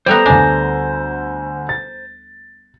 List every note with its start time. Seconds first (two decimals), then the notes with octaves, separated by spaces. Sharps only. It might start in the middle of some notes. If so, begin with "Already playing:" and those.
0.06 G3 A3 B3 C5 A#5
0.26 D2 D4 G#5
1.69 A6